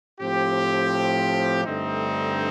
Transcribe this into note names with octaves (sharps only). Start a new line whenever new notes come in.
A2 F3 C4 G4
G2 D3 A3 C4 D#4